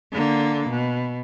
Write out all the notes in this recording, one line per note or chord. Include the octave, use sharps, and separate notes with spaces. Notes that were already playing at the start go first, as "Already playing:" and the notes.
D3 A#3
B2